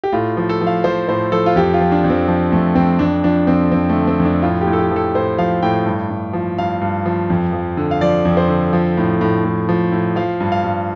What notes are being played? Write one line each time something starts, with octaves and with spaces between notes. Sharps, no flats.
G4
A2 F4
F3
A4
F3
F5
F3 C5
A2 C5
F3 A4
F4
F2 G4
F4
F3
D4
F2
C4
F3
F2 A3
F2 C4
F2 D4
F3 D4
F2 C4
F2 C4
A3
D3
C4
F2
D4
A2 F4
G4
A2
A4
G4
F3 A4
A2 C5
F3 F5
A2 G5
G2
G2
F3
G2 F5
G2
F3
F2
F3
D3
F5
F3 D5
F2
C5
D3
F3
A2
A2
A2
F3
A2
F3 F5
G2
F5
G2